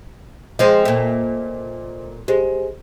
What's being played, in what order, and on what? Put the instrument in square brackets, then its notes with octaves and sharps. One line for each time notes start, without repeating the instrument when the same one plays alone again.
[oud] F3 G#3 C4 [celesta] C5 D#5
[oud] A#2 A3
[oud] G#3 [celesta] G4 C5